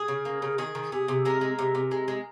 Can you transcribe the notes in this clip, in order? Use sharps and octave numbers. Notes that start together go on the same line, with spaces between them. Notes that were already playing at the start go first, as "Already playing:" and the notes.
Already playing: G#4
C#3
A#3
C#3
D#3 G#4
D#3
C3 G#4
C3
G#3 A#4
G#3
C3
C3
G#3
G#3